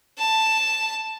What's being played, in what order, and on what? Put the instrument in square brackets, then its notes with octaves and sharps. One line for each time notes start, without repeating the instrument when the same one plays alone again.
[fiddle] A5